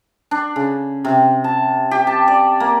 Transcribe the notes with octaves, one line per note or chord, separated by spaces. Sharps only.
D4
C#3
C3
A5
G4
A5
D5
A#3